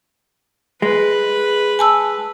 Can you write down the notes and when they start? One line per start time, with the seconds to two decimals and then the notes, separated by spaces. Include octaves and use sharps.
0.82 G#3 B4
1.79 G#5 A5 E6